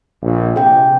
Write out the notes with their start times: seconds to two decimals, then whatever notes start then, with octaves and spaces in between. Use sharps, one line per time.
0.22 A#1
0.56 C3 G#4 G5